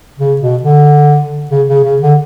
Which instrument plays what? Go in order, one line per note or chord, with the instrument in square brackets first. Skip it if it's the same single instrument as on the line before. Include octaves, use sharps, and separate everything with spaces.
[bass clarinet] C#3
B2
D3
C#3
C#3
C#3
D3